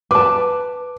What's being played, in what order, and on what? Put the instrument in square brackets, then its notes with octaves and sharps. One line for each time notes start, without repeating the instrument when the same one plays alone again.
[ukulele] B4 A5 [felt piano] D6